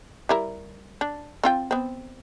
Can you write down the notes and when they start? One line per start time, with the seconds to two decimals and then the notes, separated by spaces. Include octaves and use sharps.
0.29 G3 E4 A#4
1.01 D4
1.44 C4 F4 G5
1.71 B3 C4